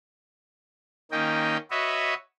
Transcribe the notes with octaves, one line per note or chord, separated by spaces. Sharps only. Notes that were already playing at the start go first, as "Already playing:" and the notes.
D#3 A#3 C#4 D#5 G5
F#4 B4 C#5 D#5 E5